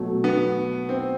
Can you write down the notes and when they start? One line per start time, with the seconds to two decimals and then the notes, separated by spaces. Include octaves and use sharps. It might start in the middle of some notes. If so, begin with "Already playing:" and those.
Already playing: B2 F#3 A3
0.24 B3
0.89 C4